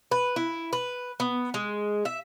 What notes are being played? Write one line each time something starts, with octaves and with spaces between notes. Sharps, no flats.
B4
E4
B4
B3
G#3
E5